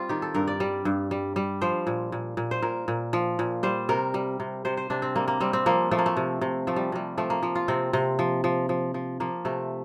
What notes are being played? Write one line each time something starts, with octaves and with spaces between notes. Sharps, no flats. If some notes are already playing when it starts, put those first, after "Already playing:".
Already playing: G3 C4 F4
D#3 G4
A4
G2 A#4
D5
G3
G2
G3
G3
F3 C5
A#2
A#2
A#2
C5
A#2 A#4
A#2
F3
A#2
G3 C5
C3 A#4
G3
C3
C3 C5
C5
C3 D4
C4
G3 A#3
A#3
G3 C4
C4
F3 A#3
F3 A3
A#3
A3
C3
C3
F3 A3
G3
C3 G3
F3 A3
A#3
F3
F4
C3 C4
C3
F3
F3
F3
F3
F3 A#3
C3 A3